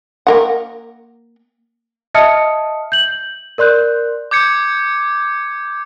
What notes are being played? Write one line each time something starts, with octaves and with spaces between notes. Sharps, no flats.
A#3 A#4 F#5
D#5 E5 A5 D#6 F6 C#7
G6 F#7
A#4 D5 C6 F#6 G6
D6 G6 G#6 C#7